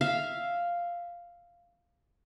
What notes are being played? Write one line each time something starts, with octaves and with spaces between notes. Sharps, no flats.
E5 F5